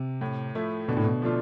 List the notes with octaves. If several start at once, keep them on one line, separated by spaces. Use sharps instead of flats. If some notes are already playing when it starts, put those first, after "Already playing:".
Already playing: C3
A2
F3 A3 E4
B2 D3
A2
B2
F3 A3 D4 F4